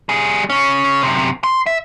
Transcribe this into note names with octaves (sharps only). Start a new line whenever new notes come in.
G3 G#4
C#3 C#4
F#2 C3
C6
E5